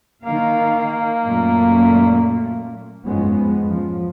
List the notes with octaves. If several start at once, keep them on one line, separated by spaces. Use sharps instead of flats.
D#3 A#3 F5
F#2 A#2 A3
F2 G#2 F3 G#3 B3 C#4
F3